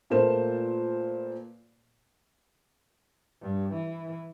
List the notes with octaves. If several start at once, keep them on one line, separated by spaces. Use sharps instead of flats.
A#2 A3 A#3 B4 C5 E7
G2
E3